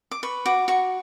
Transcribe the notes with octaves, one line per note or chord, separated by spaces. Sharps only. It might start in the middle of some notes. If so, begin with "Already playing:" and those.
D6
B4 C#6
F#4 D6
F#4 C#6